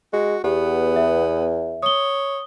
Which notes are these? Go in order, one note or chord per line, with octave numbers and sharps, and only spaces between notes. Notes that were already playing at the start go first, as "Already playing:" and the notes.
G#3 F#4
E2 B3 G4
E5
C#5 D#6 G7